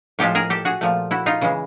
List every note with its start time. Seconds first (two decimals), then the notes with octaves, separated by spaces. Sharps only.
0.19 A2 F3 G#3 G4 A4
0.35 G#4 A#4
0.50 G4 A4
0.65 F#4 G#4
0.81 A#2 F3 A3
1.11 E4 F#4
1.26 D#4 F4
1.41 C#3 E3 G#3